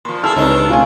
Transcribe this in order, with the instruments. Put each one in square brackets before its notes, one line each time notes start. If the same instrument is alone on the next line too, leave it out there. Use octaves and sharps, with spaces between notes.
[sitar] A#2 F3 [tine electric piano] C6
[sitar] E4 G#4 [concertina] A4 [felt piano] A5 F6
[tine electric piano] C#2 [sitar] C3 D4 D#4 [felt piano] B4 C#5
[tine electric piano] B2 A3 [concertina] C#4 [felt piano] F4 G#5